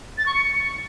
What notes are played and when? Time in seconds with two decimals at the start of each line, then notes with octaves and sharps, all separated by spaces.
0.18 A6
0.26 C#6
0.34 C#7